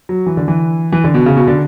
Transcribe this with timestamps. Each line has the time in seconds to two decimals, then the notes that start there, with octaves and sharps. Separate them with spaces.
0.09 F#3
0.26 E3
0.37 D3
0.48 E3
0.92 E3
1.04 D3
1.14 B2
1.26 C#3
1.37 B2
1.48 D3